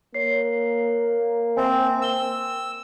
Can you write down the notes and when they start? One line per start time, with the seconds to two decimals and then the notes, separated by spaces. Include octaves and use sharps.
0.14 A#3 C#5 C7
1.57 C4 C5 E5 G#5
2.02 G5 E6 G7